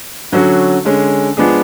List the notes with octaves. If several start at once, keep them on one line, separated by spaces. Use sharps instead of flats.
D3 F#3 C#4 F#4
D3 G#3 C#4
F3 G#3 B3 D4 G#4